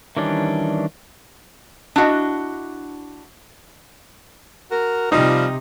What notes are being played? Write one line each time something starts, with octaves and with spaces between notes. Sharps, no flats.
D#3 E3 G3 C#4 D4
D4 E4 F#4 D#5
F#4 A#4
C3 F3 G3 D#4 F4